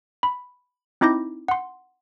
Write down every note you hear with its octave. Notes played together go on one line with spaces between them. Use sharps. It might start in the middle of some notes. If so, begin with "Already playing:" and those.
B5
C4 D#4 E4 D6 G6 A#6
F#5 C6